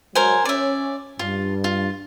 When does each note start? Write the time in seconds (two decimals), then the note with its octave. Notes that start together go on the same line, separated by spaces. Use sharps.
0.15 F#3 G#3 A#4 C5 G#5
0.45 C#4 D5 E5
1.19 G2 F4
1.64 F4